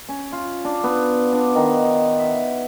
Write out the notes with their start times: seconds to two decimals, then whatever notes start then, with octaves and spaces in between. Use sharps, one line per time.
0.09 C#4
0.32 F4
0.65 D4
0.84 B3
1.32 D4
1.55 D#3
2.19 E5